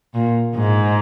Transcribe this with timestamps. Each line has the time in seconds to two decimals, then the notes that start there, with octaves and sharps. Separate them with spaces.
0.14 A#2
0.55 G#2